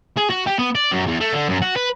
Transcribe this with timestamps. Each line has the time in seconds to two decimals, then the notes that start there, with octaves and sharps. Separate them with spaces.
0.17 G#4
0.30 F#4
0.47 G4
0.59 B3
0.75 D5
0.92 F#2
1.07 E2
1.21 A3
1.33 D3
1.49 F#2
1.62 F#4
1.77 B4